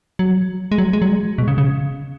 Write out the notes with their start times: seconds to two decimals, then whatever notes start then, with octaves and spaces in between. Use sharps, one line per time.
0.19 F#3
0.72 G#3
0.78 F#3
0.93 G#3
1.02 F#3
1.08 G#3
1.38 B2
1.48 C#3
1.58 C#3